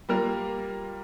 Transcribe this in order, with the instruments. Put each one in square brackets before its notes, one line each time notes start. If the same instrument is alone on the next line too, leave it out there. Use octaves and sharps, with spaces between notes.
[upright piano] G3 A#3 F4 A#4